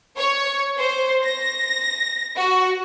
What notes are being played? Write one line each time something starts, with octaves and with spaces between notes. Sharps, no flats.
C#5
C5
A#6
F#4